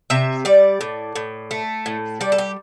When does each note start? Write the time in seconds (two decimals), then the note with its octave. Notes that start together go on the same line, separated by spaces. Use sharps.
0.10 C3 E5
0.45 G3 D5
0.81 A2
1.16 A2
1.51 A3
1.86 A2
2.21 G3 D5
2.32 A4
2.38 G4